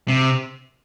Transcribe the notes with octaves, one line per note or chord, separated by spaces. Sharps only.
C3